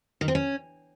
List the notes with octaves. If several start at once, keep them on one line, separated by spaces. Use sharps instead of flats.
D#3
C4
C#4